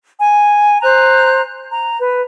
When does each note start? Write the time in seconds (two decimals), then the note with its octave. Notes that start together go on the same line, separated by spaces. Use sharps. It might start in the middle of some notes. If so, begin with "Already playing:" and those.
0.19 G#5
0.82 C5 A#5 F#6
1.71 A#5
2.00 B4